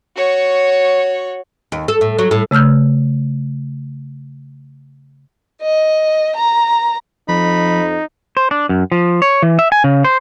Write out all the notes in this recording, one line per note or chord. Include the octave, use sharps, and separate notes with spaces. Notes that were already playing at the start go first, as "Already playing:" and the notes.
F#4 C#5
D#2
A4
A2
F#3
A2
C#3 A3 E6 F6 G6
D#5
A#5
F2 F3 D#4 B5
C5
D4
F#2
F3
C#5
E3
E5
G#5
C#3
C5